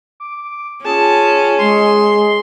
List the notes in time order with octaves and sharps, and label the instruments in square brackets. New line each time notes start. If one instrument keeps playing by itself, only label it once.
[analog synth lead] D6
[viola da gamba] C#4 [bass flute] F4 [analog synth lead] G#4 [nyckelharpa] A5
[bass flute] G#3 [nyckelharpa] C6